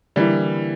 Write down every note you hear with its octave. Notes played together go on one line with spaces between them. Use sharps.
D3 E3 G3 A#3 E4